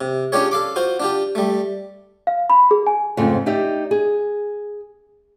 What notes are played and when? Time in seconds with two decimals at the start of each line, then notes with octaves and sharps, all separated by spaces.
0.01 C3
0.32 C#4 D4 F4 G4 G#4 C#5
0.51 A4 F5 D6
0.76 F4 F#4 C5
1.00 D4 F4 G4
1.35 G3 A3
2.27 F5
2.50 B5
2.71 G#4
2.87 G#5
3.17 F2 G#2 C#3 F3 A3
3.46 D#4 G4 D5 E5
3.91 G#4